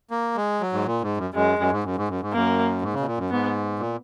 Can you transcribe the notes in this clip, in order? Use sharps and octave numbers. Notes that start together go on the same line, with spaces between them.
A#3
G#3
F#3
G#2
A#2
G#2
F#2
F#2 G#3
F#2
G#2
F#2
G#2
F#2
G#2
F#2 A#3
G#2
C#3
B2
A#2
F#2
G#2 B3
A#2